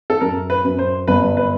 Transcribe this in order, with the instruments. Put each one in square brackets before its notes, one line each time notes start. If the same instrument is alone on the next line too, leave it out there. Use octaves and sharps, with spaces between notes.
[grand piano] A4
[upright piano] F#2 [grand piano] A#4
[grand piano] B4
[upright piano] F#2
[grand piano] C5
[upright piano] G1 [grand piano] B4
[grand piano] B4